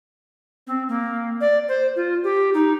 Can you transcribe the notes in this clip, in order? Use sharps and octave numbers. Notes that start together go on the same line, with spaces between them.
C4
A#3
D5
C5
F4
G4
D#4